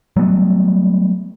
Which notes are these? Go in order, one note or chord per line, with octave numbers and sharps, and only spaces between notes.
F#3 G3 A3 B3